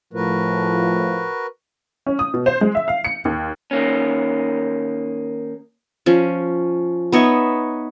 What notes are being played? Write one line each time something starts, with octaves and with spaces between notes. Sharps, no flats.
A2 F3 F#4 A#4 B4
C#4
D#6
B2
C5
G#3
E5
F5
C#7
D#2
D#3 A#3 C#4
F3 C#4
B3 D#4 C#5 E5